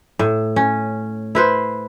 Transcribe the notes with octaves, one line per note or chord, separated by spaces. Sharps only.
A2
C#4
E4 B4 C5